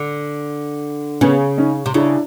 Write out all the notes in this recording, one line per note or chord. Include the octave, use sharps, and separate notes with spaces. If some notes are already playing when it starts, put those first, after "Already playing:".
Already playing: D3
C#3 B3 C#4
C#4 D#4
C3
C#3 D4 E4